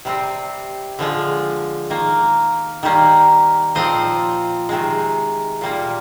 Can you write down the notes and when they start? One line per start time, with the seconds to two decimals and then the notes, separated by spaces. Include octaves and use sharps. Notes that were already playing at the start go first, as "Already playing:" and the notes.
0.05 C3 G3 C4
0.99 D3 F3 G#3
1.90 D#3 A#3
2.83 D#3 G3 A#3
3.75 A#2 F3 C4 C5 D#5
4.69 C3 D#3 G#3
5.61 A#2 G3 A#3